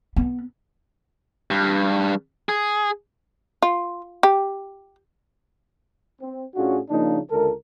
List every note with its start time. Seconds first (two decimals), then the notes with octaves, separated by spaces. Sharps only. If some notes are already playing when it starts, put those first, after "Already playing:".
0.16 B3
1.50 G2
2.49 G#4
3.62 F4
4.23 G4
6.21 C4
6.55 A2 C#4 D4 F4 F#4 G#4
6.90 C#3 F3 A#3 D4 D#4
7.30 C#2 D3 G#3 A4 A#4